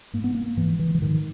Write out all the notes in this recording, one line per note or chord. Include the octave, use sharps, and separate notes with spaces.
G#2 A#3
B3
A#3
G#2 E3
E3
E3
G#2 D#3